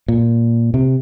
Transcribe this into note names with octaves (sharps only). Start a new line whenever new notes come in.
A#2
C3